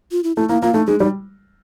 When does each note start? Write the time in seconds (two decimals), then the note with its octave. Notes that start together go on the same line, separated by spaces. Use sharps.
0.12 F4
0.24 E4
0.36 A3 E4
0.49 A#3 E4
0.62 A#3 F4
0.74 A3 D#4
0.87 G#3 D#4
0.99 G3 D#4